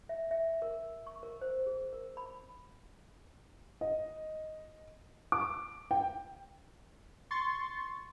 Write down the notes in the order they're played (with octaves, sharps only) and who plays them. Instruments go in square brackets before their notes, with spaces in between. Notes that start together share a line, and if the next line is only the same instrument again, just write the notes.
[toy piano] E5
E5
A#4
C#6
A#4
C5
G#4
A#4
B5
[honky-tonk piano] D#5
D6
G5
[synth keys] C6 C#6 A6